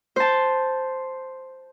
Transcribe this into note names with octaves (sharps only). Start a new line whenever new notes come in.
C5 A5